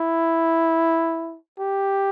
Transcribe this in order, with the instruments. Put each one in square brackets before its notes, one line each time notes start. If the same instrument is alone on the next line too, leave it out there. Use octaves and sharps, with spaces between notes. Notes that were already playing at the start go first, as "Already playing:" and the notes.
Already playing: [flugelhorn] E4
G4